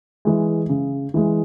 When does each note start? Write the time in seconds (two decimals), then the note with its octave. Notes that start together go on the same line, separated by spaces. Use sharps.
0.25 E3 G#3
0.69 C#3
1.14 E3 G#3